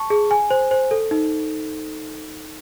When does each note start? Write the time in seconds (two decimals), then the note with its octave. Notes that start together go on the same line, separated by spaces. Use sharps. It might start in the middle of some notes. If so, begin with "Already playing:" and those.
Already playing: A5 C#6
0.10 G#4
0.31 G#5
0.50 C5
0.71 C5
0.91 A4
1.11 D#4